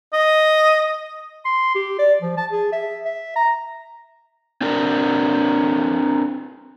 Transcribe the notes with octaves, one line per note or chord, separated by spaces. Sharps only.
D#5
C6
G4
D5
F3
A5
G#4
E5
E5
A#5
C4 D4 A#4